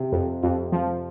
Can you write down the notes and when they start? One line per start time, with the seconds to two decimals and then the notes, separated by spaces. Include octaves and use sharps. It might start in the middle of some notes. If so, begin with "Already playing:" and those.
Already playing: C3
0.12 F2
0.43 F2
0.72 F3